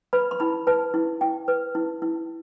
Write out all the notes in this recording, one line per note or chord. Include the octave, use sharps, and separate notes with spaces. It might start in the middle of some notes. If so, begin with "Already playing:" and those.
B4 B5
C6
E4 B5
B4 A5
E4
E4 G5
B4
E4
E4